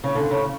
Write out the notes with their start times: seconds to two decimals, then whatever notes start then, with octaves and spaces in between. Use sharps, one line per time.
0.04 C#3
0.15 D3
0.31 C#3